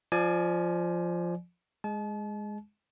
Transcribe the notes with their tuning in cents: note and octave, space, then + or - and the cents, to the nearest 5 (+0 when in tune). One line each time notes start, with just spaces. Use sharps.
F3 +0 D5 +20 G#5 +20
G#3 +0 A5 -40